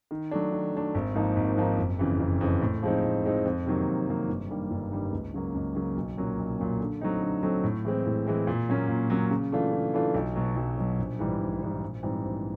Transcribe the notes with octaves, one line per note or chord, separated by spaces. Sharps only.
D#3
F#3 A3 D4
D#3
F#3 A3 D4
G#1
G#2 F3 A#3 D#4
G#1
G#2 F3 A#3 D#4
F#1
F2 C#3 E3
F#1
F2 C#3 E3
A2
F3 G#3 C4 D#4
A2
F3 G#3 C4 D#4
F2
C3 D#3 F#3 A#3
F2
C3 D#3 F#3 A#3
G1
G2 D#3 G3 A#3
G1
G2 D#3 G3 A#3
C#2
C#3 F#3 A#3
C#2
C#3 F#3 A#3
B1
A#2 F#3 A#3 C#4
B1
A#2 F#3 A#3 C#4
D3
F#3 A3 C4 D#4
D3
F#3 A3 C4 D#4
A2
E3 G#3 C4
A2
E3 G#3 C4
A#2
F#3 A#3 C#4
A#2
F#3 A#3 C#4
C#3
E3 A3 D4 F4
C#3
E3 A3 D4 F4
B1
B2 F#3
B1
B2 F#3
A#1
G#2 E3 G3
A#1
G#2 E3 G3
A#1
G#2 E3 G3 C4
A#1